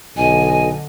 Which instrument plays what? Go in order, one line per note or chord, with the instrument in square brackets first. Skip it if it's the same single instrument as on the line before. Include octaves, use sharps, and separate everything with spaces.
[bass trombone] B1 [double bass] D3 [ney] D#5 [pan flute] G#5